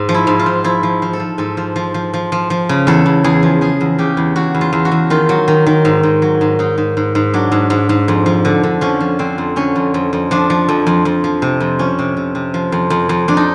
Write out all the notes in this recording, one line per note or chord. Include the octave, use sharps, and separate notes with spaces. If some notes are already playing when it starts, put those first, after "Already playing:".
Already playing: G#2
F3
E4
G#2
F4
F3
F3 E4
F3
F3
A4
F3
G#2 A4
F3
F3
F3
F3
F3
F3
C#3
E2 A4
E2
E2 G#4
F3
F3 G#4
E2
C#3 G4
E2
E2 F#4
E2
F4
E2
F#4
E2
D#3 F4
F#3
D#3
D#3
G#2
G#2
F#3
G#2
G#2 D#4
G#2
G#2
G#2
F#3 D4
G#2
G#2
G#2
F2
F3
D3
D3
F3 C#4
F3
D3 C4
F2
D3 C#4
F2
F2
F2
F3 D4
F3
F2
F2
F2
F3
C3
F2
F3 C#4
C3
C3
C3
F3
F2
F2
F2
F2 D4
D#4